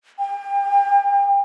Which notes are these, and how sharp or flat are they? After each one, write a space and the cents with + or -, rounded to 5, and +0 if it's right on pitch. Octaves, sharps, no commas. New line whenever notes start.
G5 +35